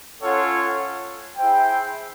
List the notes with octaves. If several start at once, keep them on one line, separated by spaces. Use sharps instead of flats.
C#4 F4 A4 C#5 F#5
E4 G#4 C5 E5 G5